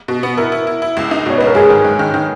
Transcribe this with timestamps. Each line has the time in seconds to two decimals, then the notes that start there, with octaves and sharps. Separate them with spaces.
0.08 B2
0.23 B3
0.37 E4 A#4
0.52 E4
0.67 E4
0.82 E4
0.97 C#2
1.11 D#4
1.26 B2 C#5
1.38 C#2 B4
1.47 A#4
1.55 G#2 G#4
1.70 D#3
1.84 G#2
1.99 D#3
2.14 D#3